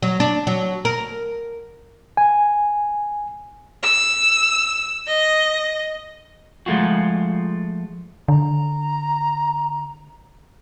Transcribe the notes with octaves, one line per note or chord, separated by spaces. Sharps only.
F#3
D4
F#3
A#4
G#5
E6
D#5
F3 G#3 A3 F4 F#4
D3 A#5